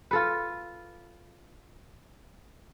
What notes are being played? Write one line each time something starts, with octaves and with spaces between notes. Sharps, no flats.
F4 A4 B4